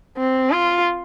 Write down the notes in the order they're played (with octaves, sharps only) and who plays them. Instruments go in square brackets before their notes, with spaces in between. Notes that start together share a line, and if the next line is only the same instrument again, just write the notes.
[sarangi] C4
F4